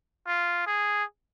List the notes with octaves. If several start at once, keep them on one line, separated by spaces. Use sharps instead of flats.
F4
G#4